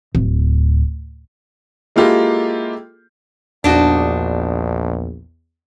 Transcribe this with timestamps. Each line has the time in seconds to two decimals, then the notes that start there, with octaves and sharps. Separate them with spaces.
0.15 D1
1.96 G#3 A#3 E4 F4 G4 A4
3.64 A#1 E2 D4 D#4 F#4